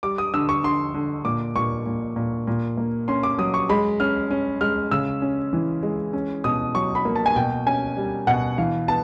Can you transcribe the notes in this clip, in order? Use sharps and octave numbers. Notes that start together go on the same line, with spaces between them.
G3 D6
D#6
D3 E6
C#6
D3 C6
D3
A#2 D6
A#2 C#6
A#2
A#2
A#2
A#3
C#4 C6
D6
F#3 D#6
C#6
G#3 B5
C#4 F6
C#4
G#3 F6
C#3 E6
C#4
E3
G#3
C#4
B2 D#6
F#3 C#6
B5
A#3
A5
G#5
B2 G5
C#4 G#5
G3
B2 F#5
E3 F5
B3 A5